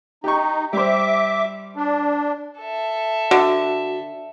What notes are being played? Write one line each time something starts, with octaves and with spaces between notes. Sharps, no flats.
D#4 G4 C#6
G3 C5 E5 D6
D4
A4 E5
D3 F#4